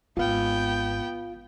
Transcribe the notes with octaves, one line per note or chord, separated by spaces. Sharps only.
G#1 B3 F4 F5 G5